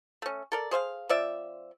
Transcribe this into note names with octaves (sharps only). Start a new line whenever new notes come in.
A3 C#4
A4 A#4 D5
G#4 C5 E5 F5
F3 C4 D5 E5